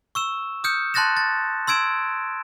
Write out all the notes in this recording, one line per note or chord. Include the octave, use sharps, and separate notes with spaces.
C#6 E6 E7
D#6 F6 G6 C#7
A5 C6 F#6 A6 A#6 E7
A6
C6 E6 G#6 D7 E7